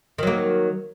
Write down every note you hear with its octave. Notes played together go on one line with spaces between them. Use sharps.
D#3 F#3 A#3